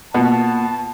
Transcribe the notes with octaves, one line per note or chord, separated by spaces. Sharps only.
B2 A#3 F4 F#5 A5